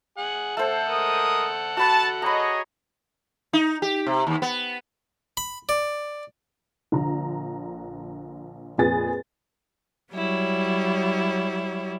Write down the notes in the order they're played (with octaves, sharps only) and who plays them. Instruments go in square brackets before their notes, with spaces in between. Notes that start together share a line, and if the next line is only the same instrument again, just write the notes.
[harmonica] G#4 F#5
[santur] A3 C5 [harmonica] A4 F#5
[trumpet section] G#3 A#4 D#6
[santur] F#4 B5 [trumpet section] A5
[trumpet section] G#4 C#5 D#5 [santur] A#5 B5
[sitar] D#4
G4
C3
D#2
B3
[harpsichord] B5
D5
[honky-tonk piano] A#1 D3 A#5
F2 A#2 G#4 B4 G#5 A6
[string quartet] F#3 G3 E4 C#5